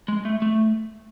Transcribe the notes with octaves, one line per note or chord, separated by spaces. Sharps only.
G#3
A3
A3